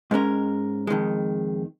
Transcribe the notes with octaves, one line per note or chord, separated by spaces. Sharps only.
G#2 G#3 C#4 A#4
F2 D#3 G#3